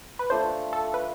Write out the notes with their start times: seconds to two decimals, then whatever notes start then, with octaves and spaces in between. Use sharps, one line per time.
0.19 B4
0.30 A3 D4 F4 C5
0.73 A4
0.94 B4